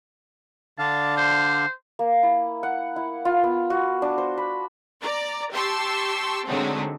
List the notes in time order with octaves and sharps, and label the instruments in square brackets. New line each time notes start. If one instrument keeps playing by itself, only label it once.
[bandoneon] D3 D4 F5 [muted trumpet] A5
[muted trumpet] C5
[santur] A#3
E4
F#5
E4
F4
B3
F#4
D4
C5
B5
[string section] D5 A#5
G4 A5 C6 C#6 E6
D3 D#3 F#3 G#3 A3 C4